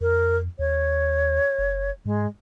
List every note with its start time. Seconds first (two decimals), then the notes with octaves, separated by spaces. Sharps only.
0.01 F2 A#4
0.59 D#2 C#5
1.59 F#1
2.05 G#2 G#3